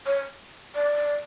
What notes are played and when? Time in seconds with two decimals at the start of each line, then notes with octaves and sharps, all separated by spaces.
0.06 C#5
0.75 D5